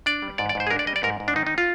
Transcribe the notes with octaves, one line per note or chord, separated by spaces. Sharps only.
D4 D5
G3
G#2 D5
D5
G#2 C5
G#4
D4 A#4
D5
G3 D#5
D5
G#2 A#4
G#2
D4
D#3 D#4
D#4
F4